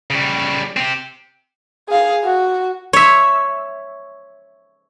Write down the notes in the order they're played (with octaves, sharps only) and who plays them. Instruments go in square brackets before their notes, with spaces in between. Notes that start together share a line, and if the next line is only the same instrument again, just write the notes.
[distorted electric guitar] C#3 G3
C4 G4
[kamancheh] G#4 F5
F#4
[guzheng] C#5 E5